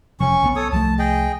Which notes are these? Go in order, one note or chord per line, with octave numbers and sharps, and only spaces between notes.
F1 C3 F3 C#4 C#6
B1 D#3 B3
A4 C#5 D#6
C2 F3 A3 A5
G#4 D#5 G5